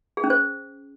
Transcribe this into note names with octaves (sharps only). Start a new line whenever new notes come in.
G#4
C#4
C5